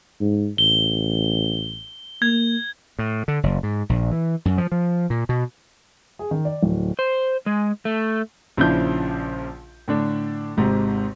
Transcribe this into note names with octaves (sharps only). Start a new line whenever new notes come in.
G#2
A1 G7
A#3 G#6
A2
D3
F#1
G#2
A#1
E3
F#2
F3
F3
A#2
B2
G#4
D#3
D5
D1
C5
G#3
A3
A#1 C#3 F3 D4 E4 G6
A2 D3 D4
G#1 G#2 C3